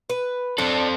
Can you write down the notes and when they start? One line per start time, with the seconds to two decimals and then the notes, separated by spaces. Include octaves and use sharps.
0.10 B4
0.58 C4 D4 A4